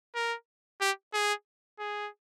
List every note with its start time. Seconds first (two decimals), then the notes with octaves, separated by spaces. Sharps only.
0.15 A#4
0.81 G4
1.14 G#4
1.79 G#4